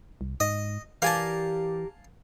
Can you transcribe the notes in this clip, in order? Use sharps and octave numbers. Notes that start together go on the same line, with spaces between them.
C2
G#2 D#5
E3 G4 A#4 D5 F5 G#5 A5